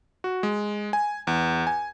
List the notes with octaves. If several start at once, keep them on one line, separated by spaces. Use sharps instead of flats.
F#4
G#3
G#5
E2
G#5